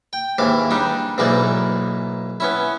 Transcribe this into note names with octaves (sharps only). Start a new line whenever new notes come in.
G5
D#2 G#2 E3 F5 D6
G3 D4 D#4
B1 G#2 E3 A#3 D#4 D5
B3 C#4 E4